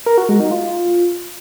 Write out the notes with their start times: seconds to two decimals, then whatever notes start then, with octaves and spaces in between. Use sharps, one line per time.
0.06 A#4
0.18 F#4
0.29 G#3
0.40 D#4
0.51 F4